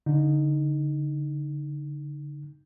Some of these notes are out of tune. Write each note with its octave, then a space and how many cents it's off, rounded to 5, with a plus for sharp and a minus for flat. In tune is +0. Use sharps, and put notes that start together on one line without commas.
D3 -25 D#4 +0